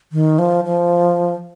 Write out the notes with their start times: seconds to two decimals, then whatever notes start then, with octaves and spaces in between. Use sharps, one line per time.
0.12 D#3
0.39 F3
0.65 F3